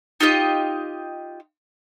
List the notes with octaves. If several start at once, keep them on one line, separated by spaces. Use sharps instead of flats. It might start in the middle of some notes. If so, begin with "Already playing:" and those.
D#4 F4 G4 D#5